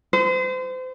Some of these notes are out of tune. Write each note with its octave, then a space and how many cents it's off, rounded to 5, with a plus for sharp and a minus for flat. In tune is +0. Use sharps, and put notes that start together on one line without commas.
C5 -35